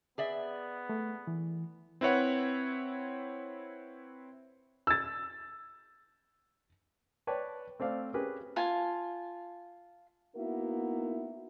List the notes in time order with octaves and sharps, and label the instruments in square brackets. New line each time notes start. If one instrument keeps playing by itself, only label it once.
[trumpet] B3 [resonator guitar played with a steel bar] G#4 D5 E5
[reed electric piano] A3
E3
[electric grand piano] C4 E4 B4 C#5 F#5
[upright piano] E6 A6
[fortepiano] B4 C#5 D5 G5 A5
A3 C4 D5 F5
C#4 G4 G#4 A#4 B4
[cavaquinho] F4 G#5 A5
[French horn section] A#3 B3 D#4 E4 F#4 A#4